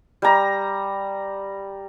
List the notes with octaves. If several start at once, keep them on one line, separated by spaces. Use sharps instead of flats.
G3 A#5